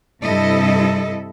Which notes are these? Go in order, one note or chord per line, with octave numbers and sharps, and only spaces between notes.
G2 C3 E4 A4 D#5